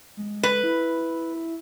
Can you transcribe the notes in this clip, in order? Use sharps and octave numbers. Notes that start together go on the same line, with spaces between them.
G#3
B4
E4